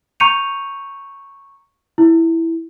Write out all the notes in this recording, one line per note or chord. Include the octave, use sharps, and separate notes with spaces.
A#5 C#6 G6 C#7 D#7 F7
E4